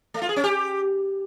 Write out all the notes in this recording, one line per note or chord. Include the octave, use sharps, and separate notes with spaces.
A3
F4
G#4
C#4
G4